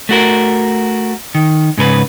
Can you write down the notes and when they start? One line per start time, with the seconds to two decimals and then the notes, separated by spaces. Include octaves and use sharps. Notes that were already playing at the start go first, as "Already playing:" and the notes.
0.09 A3 F#4 A#4
1.35 D#3
1.78 G#2 C#3 A#4 B4